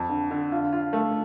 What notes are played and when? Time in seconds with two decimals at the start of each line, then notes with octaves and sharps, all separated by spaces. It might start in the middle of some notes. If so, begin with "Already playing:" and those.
Already playing: F2
0.09 D3
0.31 D3
0.52 F4
0.73 F4
0.93 A3